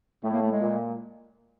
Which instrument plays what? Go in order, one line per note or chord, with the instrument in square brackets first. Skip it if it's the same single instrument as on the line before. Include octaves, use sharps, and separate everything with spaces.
[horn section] A2 [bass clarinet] A3
[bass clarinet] A#3
A3
G#3
[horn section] A#2